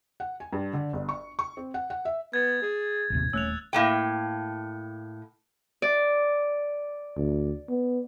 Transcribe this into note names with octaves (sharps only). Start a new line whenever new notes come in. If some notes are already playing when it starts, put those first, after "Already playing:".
F#5
G#5
G2
D3
G1
C#6
C#6
C4
F#5
F#5
E5
B3 G#6 A6
G#4
A1 D#2 C3
D#1 A3 C#4 E6 F#6 F7
A2 A#3 G5
D5
D2
B3